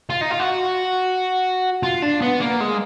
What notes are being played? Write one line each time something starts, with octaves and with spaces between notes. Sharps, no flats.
F4
D#4
F4
F#4
F4
D4
B3
A#3
G#3